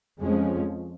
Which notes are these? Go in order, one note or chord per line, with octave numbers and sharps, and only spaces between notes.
F2 F3 G#3 C#4